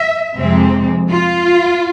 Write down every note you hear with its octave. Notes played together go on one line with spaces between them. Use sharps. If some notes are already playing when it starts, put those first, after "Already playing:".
Already playing: E5
F2 C3 G#3 C4
F4